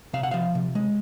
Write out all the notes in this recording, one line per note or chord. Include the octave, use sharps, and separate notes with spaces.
C3 F5
F#5
F3 F5
C3
G#3